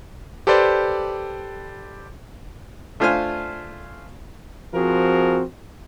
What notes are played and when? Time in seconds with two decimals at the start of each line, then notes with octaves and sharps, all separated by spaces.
0.47 G4 A4 B4 C5 D5
3.00 A3 D4 F4 C5 G#5 F6
4.74 F3 C4 F#4 G#4 A#4